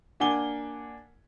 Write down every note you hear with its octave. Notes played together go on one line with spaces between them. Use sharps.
A#3 D4 F#5 G#5 D6 G7